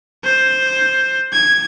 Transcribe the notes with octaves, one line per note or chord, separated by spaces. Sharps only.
C5
G#6